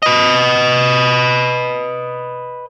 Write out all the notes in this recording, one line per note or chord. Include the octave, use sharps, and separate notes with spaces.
B4 D#5